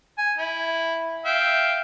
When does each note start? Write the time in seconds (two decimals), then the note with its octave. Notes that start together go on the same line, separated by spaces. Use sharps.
0.18 G#5
0.38 E4
1.25 E5 F5 G5